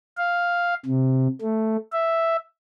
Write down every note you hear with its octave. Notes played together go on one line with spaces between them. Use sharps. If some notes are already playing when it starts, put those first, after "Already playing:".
F5
C3
A3
E5